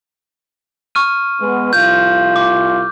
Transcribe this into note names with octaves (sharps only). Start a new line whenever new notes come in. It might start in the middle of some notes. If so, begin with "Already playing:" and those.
C#6 F6 D#7
G#3 B3
C2 F4 G6
D6